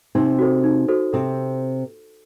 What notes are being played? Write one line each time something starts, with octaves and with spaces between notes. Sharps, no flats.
C3 C4 D#4
F#4 A4 C5
D#4
F#4 A4 C5
C3 C4 A4